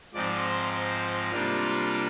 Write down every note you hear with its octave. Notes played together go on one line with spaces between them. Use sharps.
G#2 F3 C4 D#4 D5
C5
C5
C3 G3 A#3 D4 F4